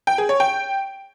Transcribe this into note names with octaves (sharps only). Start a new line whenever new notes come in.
G5
G#4
C#5
G5